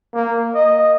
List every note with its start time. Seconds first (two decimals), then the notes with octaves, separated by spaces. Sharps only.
0.14 A#3
0.55 D#5